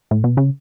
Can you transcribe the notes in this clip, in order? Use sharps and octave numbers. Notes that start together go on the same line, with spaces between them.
A2
B2
C#3